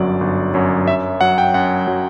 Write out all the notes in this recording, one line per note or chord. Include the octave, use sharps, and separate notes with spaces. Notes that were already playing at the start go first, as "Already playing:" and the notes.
Already playing: G1 F#2 F#3 D5
G1
F#2 F#3
F#2 E5
F#3 F#5
G5
F#2 F#5
F#3